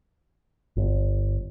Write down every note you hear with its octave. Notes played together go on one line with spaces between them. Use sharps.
G1